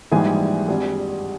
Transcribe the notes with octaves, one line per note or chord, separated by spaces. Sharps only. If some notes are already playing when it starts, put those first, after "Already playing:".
A#1 G#2 E3 G3 G#4 G#5
G#1 G2 G3